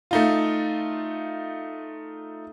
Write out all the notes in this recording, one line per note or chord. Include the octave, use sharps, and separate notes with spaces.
A3 D#4 F4